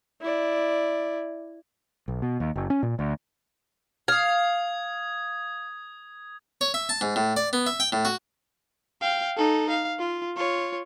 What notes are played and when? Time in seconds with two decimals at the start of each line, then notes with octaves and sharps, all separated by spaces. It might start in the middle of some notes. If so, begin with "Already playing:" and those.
0.22 E4 D5
2.08 B1
2.22 B2
2.40 D#2
2.56 F#1
2.70 C#4
2.83 A#2
2.99 D2
4.08 F5 D#6 G#6
6.61 C#5
6.74 E5
6.89 A5
7.01 G#2
7.16 A2
7.37 D5
7.53 B3
7.67 E5
7.80 G5
7.92 A2
8.05 F#4
9.01 F5 G5
9.37 D#4 A4
9.70 F5
9.99 F4
10.36 F4 C#5